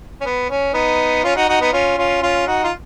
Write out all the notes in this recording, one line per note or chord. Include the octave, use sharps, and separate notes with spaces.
C#4
B3
C#4
B3 D#4
C#4 F4
D#4 F#4
D#4 F#4
B3 D#4
C#4 F4
C#4 F4
C#4 F4
D#4 F#4
F4